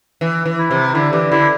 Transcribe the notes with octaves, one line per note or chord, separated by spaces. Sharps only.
E3
E3
E4
C3
D3 E4
E3 G4
D3 E4